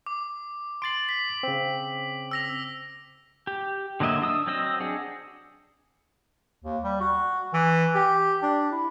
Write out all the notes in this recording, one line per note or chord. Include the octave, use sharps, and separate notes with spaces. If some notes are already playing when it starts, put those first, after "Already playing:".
D6
C6 A6 C7 D7 F#7
B6
C#3 C4
E6 A#6 F7
G4
D3 F#3 A#3 D#5 E5
D4 D#6 E6
F#3 C4 D#5 E6
D4 G#4 F#5 G#5
D#2
G3
F#4
E3
G4
D4
E4